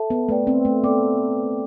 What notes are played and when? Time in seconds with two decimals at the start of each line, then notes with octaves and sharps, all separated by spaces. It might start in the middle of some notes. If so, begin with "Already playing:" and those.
Already playing: A4 E5 A5
0.10 B3
0.29 A3 B4 D5 G5
0.47 C4
0.65 A3
0.84 B3 A4 D5 G5 D6